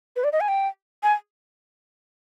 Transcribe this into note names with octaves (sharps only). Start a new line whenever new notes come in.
B4
D5
D#5
G#5
G5
G#5